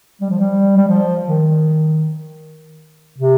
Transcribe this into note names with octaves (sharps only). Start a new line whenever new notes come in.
G3
F3
G3
G3
F3
D#3
C3